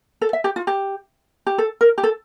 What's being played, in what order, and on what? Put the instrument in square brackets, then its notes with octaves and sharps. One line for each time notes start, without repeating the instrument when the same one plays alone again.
[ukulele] A4
E5
G4
F4
G4
G4
A4
A#4
G4
A4